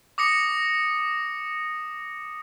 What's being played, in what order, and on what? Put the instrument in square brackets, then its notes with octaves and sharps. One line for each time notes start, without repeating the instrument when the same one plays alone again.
[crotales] D6 D#6 A#6 C#7